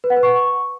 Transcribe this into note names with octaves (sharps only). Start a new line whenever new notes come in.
B4
F#5
B4
C#6